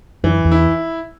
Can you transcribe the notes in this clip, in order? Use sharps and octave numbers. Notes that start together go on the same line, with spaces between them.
F#2 E3
E2
E4